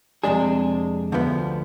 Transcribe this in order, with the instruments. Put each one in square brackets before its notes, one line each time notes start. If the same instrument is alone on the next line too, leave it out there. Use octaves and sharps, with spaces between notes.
[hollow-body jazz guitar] F2 C3 G#3 D4 G#4
D2 D3 F3 B3